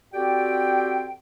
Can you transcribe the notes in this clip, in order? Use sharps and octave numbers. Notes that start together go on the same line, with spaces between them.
C4 F#4 G4 A4 D5 G5